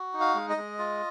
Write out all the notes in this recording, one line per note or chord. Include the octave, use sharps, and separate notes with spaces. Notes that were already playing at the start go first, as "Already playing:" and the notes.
Already playing: F#4
D#4
F5
G#3
D#5
G#3
F4